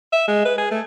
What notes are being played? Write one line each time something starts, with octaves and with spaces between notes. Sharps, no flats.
E5
G#3
B4
G#4
A3